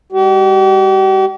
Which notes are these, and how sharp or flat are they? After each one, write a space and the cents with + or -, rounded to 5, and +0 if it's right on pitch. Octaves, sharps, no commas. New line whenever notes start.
G3 +45 G4 -45